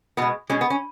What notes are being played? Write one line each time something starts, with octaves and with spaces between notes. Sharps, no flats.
B2 G#3 B3
B2 G#3 C#4
B3
C#4